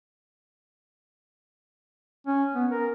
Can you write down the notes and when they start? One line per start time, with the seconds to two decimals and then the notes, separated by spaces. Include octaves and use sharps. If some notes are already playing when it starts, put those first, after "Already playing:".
2.27 C#4
2.55 B3
2.72 A#4